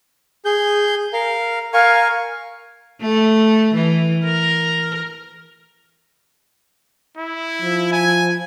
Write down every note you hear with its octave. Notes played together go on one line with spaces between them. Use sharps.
G#4 G6
A#4 F5
A#4 F5 G#5 C#6
A3
E3
A#4
E4
F3
G#5